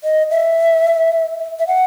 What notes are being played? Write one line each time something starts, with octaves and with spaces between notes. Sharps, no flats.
D#5
E5
E5
F#5